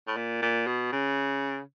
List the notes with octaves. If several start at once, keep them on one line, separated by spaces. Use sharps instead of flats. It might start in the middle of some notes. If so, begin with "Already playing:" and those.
A2
A#2
A#2
B2
C#3